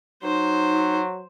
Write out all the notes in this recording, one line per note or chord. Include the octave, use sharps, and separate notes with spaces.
F#3 D#4 C5